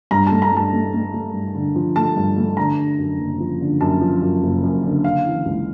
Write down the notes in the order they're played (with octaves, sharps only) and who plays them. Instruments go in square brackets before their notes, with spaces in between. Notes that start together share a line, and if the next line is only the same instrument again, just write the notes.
[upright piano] G2 A#5
A3 A5
A#5
G2 A5
A3
A3
A3
G2
D3
F3
A3 A5
G2
A3
D3 A#5
D3
F#2
F#1
F3
D3
F#2 A5
F3
F#2
F#1
F#2
D3
C#3 F5
E3
C#2